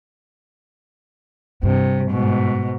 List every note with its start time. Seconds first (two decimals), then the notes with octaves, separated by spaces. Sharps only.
1.63 G2 C3
2.10 G#2 B2